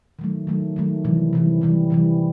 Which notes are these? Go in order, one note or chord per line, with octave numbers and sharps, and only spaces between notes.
D#3 F#3 A3
D#3 F#3 A3
D#3 F#3 A3
C3 E3 G3
C3 E3 G3
C3 E3 G3
C3 E3 G3